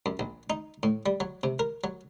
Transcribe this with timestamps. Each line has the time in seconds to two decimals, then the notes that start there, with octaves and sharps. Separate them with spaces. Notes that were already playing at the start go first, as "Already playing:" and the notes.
0.06 F#2
0.19 A#1
0.50 D#4
0.83 A2
1.06 G3
1.20 F#3
1.43 C3
1.59 A#4
1.84 F#3